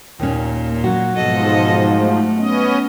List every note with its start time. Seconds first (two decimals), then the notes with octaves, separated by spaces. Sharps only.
0.20 D#2 A#2 C#4
0.84 F#3 F#4
1.16 G#2 B2 F3 A4 D#5
1.96 A3
2.37 B3 C#4 D#5